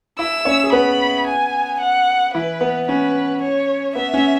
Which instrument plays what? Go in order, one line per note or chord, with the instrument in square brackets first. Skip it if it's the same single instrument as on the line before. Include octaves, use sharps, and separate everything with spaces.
[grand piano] E4 E5 [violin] E6
[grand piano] C#4 C#5
G#4
[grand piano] B3 B4 [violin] B5
[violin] G#5
F#5
[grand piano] E3 E4 [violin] B4
[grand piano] B3
[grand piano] C#4 [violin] B4
[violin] C#5
[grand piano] B3 [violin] E5
[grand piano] C#4